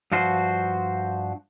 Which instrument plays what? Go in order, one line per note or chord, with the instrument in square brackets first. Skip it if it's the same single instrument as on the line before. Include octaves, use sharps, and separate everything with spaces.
[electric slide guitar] G2 F3 F#4 C5